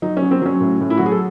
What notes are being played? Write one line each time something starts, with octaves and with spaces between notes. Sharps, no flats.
F#3 D#4
C#4
F#3
C4
F#3 C#4
A2
A2
E4
F#3 F#4
G#4
A4